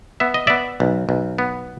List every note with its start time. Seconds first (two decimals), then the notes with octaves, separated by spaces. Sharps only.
0.20 B3 E5
0.34 D#5
0.47 B3 D5 E5
0.80 B1
1.09 B1
1.38 B3